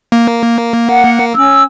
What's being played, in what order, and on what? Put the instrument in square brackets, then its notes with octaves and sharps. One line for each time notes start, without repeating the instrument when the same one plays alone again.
[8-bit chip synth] A#3
[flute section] F#5
C#4 E6